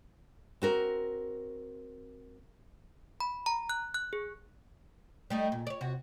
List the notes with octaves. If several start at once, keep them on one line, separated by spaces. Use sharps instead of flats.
C4 F#4 A#4
B5
A#5
F#6
F#6
G#4
G3 A3 D#4
A#2
C#5 D5
C3 F#4